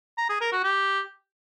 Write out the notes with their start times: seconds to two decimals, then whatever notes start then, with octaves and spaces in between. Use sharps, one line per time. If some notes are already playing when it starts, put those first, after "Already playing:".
0.18 A#5
0.29 G#4
0.41 A#4
0.52 F#4
0.64 G4